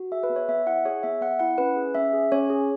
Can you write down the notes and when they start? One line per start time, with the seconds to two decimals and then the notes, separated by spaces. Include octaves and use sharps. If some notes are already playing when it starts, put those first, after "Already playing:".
Already playing: F#4
0.12 G#4 E5
0.23 B4
0.30 B3
0.36 C#5
0.48 B3 E5
0.66 E4 F#5
0.85 G#4 C#5
1.03 B3 E5
1.21 B3 F#5
1.39 E4 F#5
1.58 C#4 B4
1.76 G#4
1.95 C#4 E5
2.13 G#4
2.32 C#4 C#5
2.50 G#4